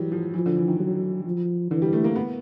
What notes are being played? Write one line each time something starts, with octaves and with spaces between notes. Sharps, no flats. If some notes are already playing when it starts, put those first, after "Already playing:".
Already playing: E3 F#3 G3
F3
E3 F3
D3
E3
D#3
F#3
F3
D3 E3
G3
A3
A#3
B3